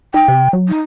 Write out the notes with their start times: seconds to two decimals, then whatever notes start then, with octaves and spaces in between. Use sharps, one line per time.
0.14 D#4 G5
0.28 C3
0.53 F#3
0.69 D#4